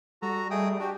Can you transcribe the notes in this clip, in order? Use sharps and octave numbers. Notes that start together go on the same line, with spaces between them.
G3 F#4 A4 A#5
A3 G#4 D#5 G5 D#6
D4 F#4 G4